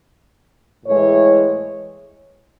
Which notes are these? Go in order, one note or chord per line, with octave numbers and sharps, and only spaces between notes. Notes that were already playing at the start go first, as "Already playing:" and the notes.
A2 E3 G#3 C#5